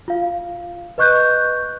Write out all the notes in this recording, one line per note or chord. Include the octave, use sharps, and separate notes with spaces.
F4 F5
B4 D#5 C#6 F#6 G6